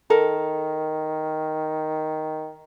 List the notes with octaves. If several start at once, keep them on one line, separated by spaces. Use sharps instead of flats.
D#3 A4 A#4